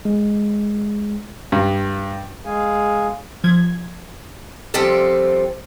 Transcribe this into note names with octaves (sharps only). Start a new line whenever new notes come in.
G#3
G2
G#3 G#4 F5 G#5
F3 G#6
F3 G3 C4 F4 A4 D5